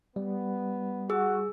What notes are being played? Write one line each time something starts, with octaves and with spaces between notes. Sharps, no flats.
G3 B3
F#4 G#4 E6